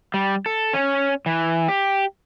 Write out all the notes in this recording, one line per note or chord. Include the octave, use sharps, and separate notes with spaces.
G3
A4
C#4
E3
G4